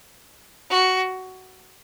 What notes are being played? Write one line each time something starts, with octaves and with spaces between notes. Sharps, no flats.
F#4